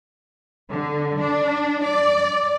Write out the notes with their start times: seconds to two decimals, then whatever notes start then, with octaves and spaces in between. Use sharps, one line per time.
0.71 D3
1.20 D4
1.83 D5